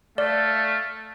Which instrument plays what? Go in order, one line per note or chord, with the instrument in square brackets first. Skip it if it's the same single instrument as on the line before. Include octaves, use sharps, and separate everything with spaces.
[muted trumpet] A3 [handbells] D5 [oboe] F5